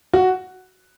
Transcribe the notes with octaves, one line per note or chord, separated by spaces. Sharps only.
F#4